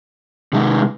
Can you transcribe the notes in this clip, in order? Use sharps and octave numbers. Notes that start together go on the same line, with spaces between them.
C3 D#3 G#3 D#4